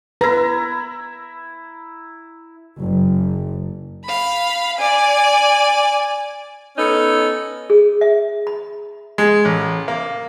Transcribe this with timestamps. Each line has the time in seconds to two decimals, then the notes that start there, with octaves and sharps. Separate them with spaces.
0.21 E4 B4 A#5
2.78 F#1
4.05 F5 B5
4.78 D5 G#5
6.77 B3 C#4 D#4 A4
7.70 G#4
8.01 E5
8.47 B5
9.18 G#3
9.45 A1
9.88 A#3